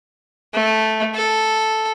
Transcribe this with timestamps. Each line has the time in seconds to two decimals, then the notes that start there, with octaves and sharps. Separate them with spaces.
0.54 A3
1.15 A4